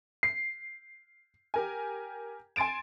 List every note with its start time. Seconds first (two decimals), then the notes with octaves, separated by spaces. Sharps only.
0.23 C7
1.54 G4 A#4 G#5
2.56 G#5 C6 A6 D7 E7